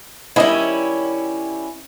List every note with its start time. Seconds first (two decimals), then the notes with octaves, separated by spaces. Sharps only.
0.36 D#3 G3 C#4 E4 D#5